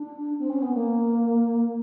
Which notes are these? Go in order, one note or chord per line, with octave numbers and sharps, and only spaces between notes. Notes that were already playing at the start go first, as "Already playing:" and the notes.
Already playing: D4
C4
C#4
B3
A#3